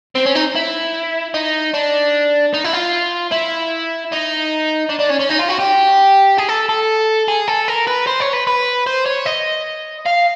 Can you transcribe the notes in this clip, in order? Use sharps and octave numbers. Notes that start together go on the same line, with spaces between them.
C4
C#4
D#4
E4
D#4
D4
D#4
E4
F4
E4
D#4
D4
D4
C#4
C#4
D#4
F4
F#4
G4
G#4
A4
A4
G#4
A4
A#4
B4
C5
C#5
B4
B4
C5
C#5
D#5
F5